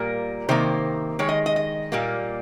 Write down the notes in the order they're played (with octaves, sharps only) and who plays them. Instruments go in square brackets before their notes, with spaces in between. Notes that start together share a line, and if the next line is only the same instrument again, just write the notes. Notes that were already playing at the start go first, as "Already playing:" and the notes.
Already playing: [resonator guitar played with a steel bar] A#2 G3 A#3 A#4
C3 D#3 A#3 C5
D#3 G#3 C#5
D#5
D#5
D#5
A#2 G3 A#3